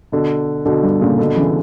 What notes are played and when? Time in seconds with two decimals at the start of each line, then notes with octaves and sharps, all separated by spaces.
0.12 B2 D3
0.65 B2 D3
0.83 G2
1.01 A#2 C#3
1.19 B2 D3
1.36 C#3 E3